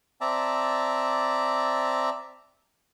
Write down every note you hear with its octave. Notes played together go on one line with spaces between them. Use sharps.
C4 D5 E5 A5 A#5